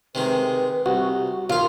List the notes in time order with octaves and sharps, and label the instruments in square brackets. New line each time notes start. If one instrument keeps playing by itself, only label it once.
[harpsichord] C3 D#3 G#3 [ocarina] B4
[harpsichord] C2 [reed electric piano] F#4 [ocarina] G4
[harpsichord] D#2 F5 [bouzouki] F4 [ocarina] A#4